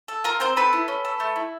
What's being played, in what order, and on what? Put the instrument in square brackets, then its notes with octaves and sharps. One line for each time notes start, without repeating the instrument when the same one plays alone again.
[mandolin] A4
F4 A#4
C4 A#4 C5
C4 A4 B4
E4
C#4
A4
A3
E4